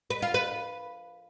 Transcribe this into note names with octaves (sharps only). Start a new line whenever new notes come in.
B4
F4
B4